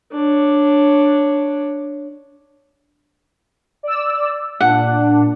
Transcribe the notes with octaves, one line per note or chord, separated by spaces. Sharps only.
D4 C#5
D5 E6
A#2 D4 F#5